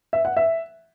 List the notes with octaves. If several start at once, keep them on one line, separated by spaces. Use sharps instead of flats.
E5
F#5
E5